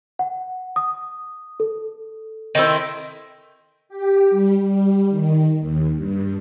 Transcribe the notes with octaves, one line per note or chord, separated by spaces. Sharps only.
F#5
D#6
A4
D#3 C4 E4
G4
G3
G3
D#3
D#2
G2